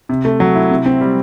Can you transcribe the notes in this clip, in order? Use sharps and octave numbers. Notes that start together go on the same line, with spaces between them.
C3
A3
F#3
E4
C3
C4
G3